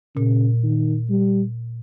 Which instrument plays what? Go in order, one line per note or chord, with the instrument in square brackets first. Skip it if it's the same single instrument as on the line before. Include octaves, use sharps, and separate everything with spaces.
[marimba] A#2 [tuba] C#3
[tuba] D#3
G3